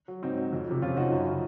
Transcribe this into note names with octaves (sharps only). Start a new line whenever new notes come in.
F#3
G#2 C4 D#4
F#3
F2
C3 F3
F2 C#4 F4
C3 F3 D#4 F#4
F#2
C#3 F3